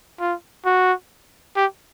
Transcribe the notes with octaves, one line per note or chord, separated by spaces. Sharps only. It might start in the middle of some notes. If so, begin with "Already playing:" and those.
F4
F#4
G4